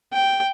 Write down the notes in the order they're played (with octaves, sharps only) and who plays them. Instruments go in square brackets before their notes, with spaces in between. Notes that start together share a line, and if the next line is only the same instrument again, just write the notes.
[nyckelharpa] G5